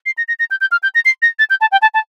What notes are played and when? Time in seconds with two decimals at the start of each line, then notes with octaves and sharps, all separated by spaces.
0.06 C7
0.18 A#6
0.28 A#6
0.39 A#6
0.51 G6
0.61 G6
0.72 F6
0.83 G6
0.95 A#6
1.05 C7
1.22 A#6
1.39 A6
1.50 G6
1.61 A5
1.72 G5
1.82 A5
1.94 A5